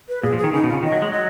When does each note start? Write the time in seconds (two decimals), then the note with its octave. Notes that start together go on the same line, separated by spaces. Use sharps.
0.09 B4
0.23 A#2 G#4
0.33 F3
0.38 G#4
0.44 D#3
0.53 C#3 D#4
0.64 B2
0.68 C#3 F4
0.83 D#3 D#5
0.92 F#3
1.02 G#3
1.12 F#3 D#5